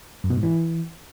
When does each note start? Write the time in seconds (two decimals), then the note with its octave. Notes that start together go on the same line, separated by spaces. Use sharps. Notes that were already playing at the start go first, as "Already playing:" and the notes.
0.24 F#2
0.30 B2
0.37 G#2
0.43 E3